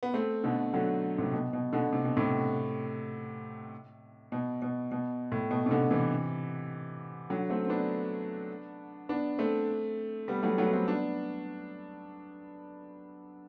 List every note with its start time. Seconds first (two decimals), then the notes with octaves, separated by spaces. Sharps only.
0.03 B3
0.14 A3 C4
0.44 B2 D3
0.74 D3 F#3
1.18 A2 C3
1.33 B2
1.53 B2
1.73 B2 D3
1.93 C3
2.05 B2
2.17 A2 C3
4.32 B2
4.62 B2
4.91 B2
5.32 A2
5.51 B2
5.66 C3
5.71 B2 D3
5.91 C3 E3
7.30 D3 F#3
7.50 A3 C4
7.65 C4
7.69 B3 D4
9.09 B3 D4
9.38 A3 C4
10.28 G3 B3
10.43 F#3 A3
10.58 F#3 A3
10.67 B3
10.73 A3 C4
10.88 B3 D4